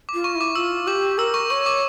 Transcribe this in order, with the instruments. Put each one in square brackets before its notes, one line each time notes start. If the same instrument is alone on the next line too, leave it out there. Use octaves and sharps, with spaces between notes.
[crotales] D6
[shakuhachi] F4
[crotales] C#6
[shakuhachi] E4
[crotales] D6
[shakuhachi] F4 [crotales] E6
[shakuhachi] G4 [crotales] D6
[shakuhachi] A#4 [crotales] E6
[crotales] C#6
[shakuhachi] C#5 [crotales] C#6
[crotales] D6